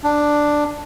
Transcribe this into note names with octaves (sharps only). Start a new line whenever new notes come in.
D4